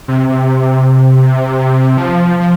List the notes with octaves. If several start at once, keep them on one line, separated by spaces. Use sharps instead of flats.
C3
C3
F3
F3